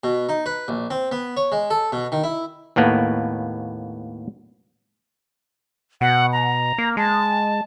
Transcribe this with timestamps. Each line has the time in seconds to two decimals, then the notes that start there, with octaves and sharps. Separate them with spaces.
0.04 B2
0.29 D#4
0.46 B4
0.68 A#1
0.91 C4
1.12 B3
1.37 C#5
1.52 G#3
1.70 A4
1.92 B2
2.12 D#3
2.24 E4
2.76 D#2 A2 A#3 B3
6.01 B2 F#5
6.33 A#5
6.78 A#3
6.97 G#3 A5